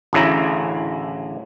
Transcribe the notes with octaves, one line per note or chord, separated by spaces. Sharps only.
A1 D2 C#3 E4 A#5